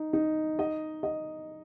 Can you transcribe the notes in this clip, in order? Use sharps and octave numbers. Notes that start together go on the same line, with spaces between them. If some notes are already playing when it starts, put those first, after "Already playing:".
Already playing: D#4
D#4
D#5
D#5